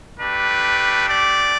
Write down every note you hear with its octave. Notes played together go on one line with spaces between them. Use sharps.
A3 D4 G4 B4
D5